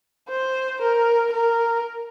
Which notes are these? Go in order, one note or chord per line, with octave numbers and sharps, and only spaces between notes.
C5
A#4
A#4